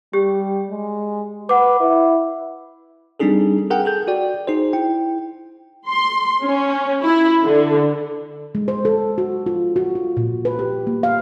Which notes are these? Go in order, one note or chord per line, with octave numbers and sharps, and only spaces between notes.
G3 G4
G#3
B4 F#5 D6
E4
G3 C4 D4 D#4 G#4 A4
G#4 A#4 F#5 G5
G#4 A4 G6
F#4 D5 G5
D#4 G#4 C5
E4 G5
C6
C#4
E4
D3
G#3
C5
A4
F#4
F4
F#4
F4
A#2
B4
G4
A#3
F5